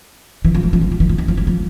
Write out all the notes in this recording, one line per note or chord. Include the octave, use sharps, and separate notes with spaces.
E3
F3
E3
F3
E3
F3
E3
F3
E3
F3
E3
F3